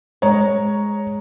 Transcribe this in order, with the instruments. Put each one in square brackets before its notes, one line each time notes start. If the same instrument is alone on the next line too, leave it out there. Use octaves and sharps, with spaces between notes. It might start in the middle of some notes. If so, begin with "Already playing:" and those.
[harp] G#3 [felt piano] C#5 A#5